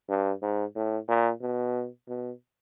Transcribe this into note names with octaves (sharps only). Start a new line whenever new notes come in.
G2
G#2
A2
A#2
B2
B2